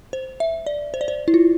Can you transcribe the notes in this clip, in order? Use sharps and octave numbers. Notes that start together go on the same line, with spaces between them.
C5
E5
D5
C5
D5
C5
E4
F4